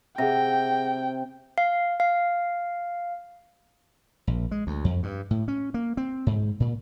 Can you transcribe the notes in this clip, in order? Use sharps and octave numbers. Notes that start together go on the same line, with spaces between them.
C3 G#4 F#5 G5 A#6
F5
F5
A#1
G#3
D2
F2
G2
A2
C#4
A#3
C4
G#2
A#2